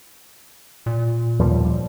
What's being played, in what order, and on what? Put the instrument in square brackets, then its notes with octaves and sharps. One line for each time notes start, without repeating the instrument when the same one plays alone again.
[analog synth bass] A#2
[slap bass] D#2 F3 G3